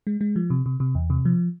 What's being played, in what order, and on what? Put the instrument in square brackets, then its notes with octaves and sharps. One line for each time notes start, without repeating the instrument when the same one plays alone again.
[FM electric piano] G#3
G#3
F3
C3
C3
C3
E2
C3
F3